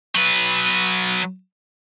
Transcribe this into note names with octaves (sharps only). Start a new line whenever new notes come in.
F#3 B4